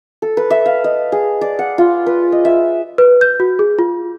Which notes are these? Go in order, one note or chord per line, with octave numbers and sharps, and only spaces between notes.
A4
B4
E5
F5
D#5
G#4
D5
F#5
F4
B4
D#5
E5
B4
G6
F#4
G#4
F4